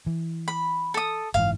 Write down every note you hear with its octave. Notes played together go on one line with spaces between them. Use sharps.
E3
B5
A4 D#6
F#1 G#2 E3 F5